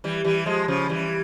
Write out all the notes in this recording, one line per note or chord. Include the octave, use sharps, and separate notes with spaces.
E3 G3
E3 G3
F3 G#3
C#3 F3
E3 G3